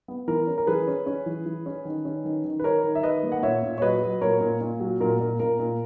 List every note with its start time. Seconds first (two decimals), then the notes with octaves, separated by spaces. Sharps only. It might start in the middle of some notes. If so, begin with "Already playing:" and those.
0.08 B3
0.28 E3 A#4
0.47 C#4
0.58 A#4
0.67 E3 G#4 B4
0.87 C#4
1.06 C#4
1.26 E3
1.46 E3
1.66 C#4
1.85 D#3
2.05 C#4
2.25 D#3
2.44 D#3
2.60 B4
2.64 D#3 A#4 C#5
2.84 D#3
2.95 E5
3.03 D#3 B4 D#5
3.23 A#3
3.32 F#5
3.43 A#2 C#5 E5
3.63 A#2
3.78 C#5
3.82 F#3 B4 D#5
4.02 F#3
4.21 A#2 A#4 C#5
4.41 A#2
4.61 A#2
4.80 F#3
5.01 A#2 A#4
5.20 A#2
5.40 A#2 A#4
5.59 A#2